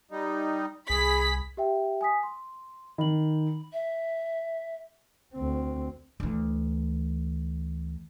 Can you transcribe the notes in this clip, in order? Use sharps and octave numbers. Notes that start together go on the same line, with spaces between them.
G3 D#4
C2 G#4 B5 B6
G4 E5 G5
G#5 D#6 B6
C6
D#3 B5 F#7
E5
D2 C4
D2 E3